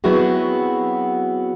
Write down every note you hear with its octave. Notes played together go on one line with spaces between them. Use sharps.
F#3 B3 C4 E4 F#4 G#4